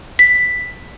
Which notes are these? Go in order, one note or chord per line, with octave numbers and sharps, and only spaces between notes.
B6